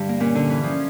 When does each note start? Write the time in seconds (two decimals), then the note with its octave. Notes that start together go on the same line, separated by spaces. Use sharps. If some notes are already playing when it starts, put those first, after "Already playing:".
Already playing: G2 D3
0.09 A#3
0.20 A#2 C#4
0.35 D3
0.50 E3
0.63 F3